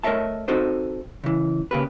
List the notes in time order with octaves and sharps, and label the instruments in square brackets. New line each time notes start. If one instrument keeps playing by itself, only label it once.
[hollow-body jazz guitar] A3 A#4 C#5 D#5 E5 A5
C4 D#4 F#4 A4 C5 D#5
C#3 E3
C#3 A#3 G4 B4